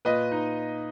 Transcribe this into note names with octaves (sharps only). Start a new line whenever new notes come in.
A#2 B4 D#5
D#4